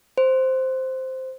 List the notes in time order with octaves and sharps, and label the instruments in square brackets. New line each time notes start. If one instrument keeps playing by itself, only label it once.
[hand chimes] C5